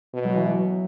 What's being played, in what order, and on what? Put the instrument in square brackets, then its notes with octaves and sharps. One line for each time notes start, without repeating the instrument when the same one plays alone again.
[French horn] B2
[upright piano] F#3
E3
F#3